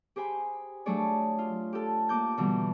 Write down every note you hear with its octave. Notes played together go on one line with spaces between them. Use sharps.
G4 G#4 C5 G#5 B5
F#3 A3 D4 G#4 C#5 D5
F4
G4 A4
A#3 D6 G6
B2 D3 E3 G3